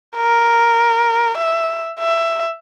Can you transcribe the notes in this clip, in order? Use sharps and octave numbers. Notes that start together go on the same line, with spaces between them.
A#4
E5
E5